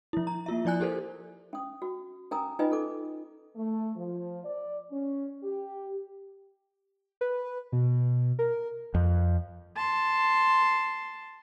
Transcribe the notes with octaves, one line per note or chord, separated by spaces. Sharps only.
F3 E4
A#5
A#3 F4 E5
F3 E4 D5 G#5 F#6
E4 G4 A4 A#4 C5
C#4 D#6
F#4
C#4 A#4 G#5 A#5 D#6
C#4 D#4 F4 B4 D#5 G#5
C#4 A4 D6
A3
F3
D5
C#4
G4
B4
B2
A#4
F2
A5 C6